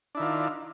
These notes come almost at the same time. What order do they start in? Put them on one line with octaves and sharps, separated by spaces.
D4 E4 D#3 F4